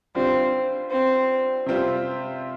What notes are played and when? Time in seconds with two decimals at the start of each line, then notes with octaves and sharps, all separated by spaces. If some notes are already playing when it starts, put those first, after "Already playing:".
0.15 D3 G3 C4 D4 F4
0.91 C4
1.66 C3 G3 C4 F4